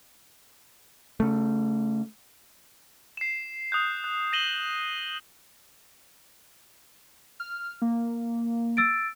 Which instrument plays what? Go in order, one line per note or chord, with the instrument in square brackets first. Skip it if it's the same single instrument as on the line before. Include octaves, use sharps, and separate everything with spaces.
[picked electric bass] C#3 A3
[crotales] C7 E7
D#6 F#6 G6
F#6
A#6 D#7 E7 F#7 G7
[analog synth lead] F6
A#3
[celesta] E6 A6 D7